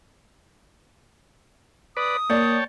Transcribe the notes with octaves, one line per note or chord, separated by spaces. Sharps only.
B4 D5 D#6
A#3 C#5 D5 G5 A5